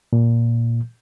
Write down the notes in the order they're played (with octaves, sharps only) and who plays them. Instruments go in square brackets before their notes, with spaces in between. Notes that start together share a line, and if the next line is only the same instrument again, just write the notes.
[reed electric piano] A#2